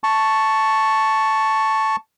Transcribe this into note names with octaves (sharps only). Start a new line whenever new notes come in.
A5 C#6